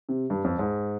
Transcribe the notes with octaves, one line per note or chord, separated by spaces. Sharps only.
C3
G2
F2
G#2